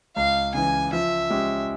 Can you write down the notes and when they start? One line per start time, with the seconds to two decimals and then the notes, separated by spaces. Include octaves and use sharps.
0.16 C#2 F5
0.54 C#3 E3 G#5
0.93 F3 E5
1.30 G#3 C#4 G4